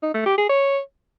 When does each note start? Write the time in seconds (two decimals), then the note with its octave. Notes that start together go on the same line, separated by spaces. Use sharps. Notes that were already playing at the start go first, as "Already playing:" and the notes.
0.03 D#4
0.14 A3
0.26 G4
0.38 G#4
0.49 C#5